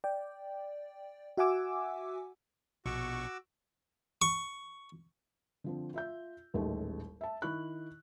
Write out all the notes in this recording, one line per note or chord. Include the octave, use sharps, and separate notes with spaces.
D5 G5
F#4 E5 F#5 G#5 D6 E6
A#1 B2 F#4 C#6 D6 E6
C#6
D3 F3 C4
F4 E5 G6
D#1 A1 D#2 G#3 A3
E5 A5
D#3 E4 C#6 F#6